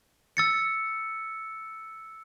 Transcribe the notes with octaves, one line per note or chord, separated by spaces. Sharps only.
E6 A6 C#7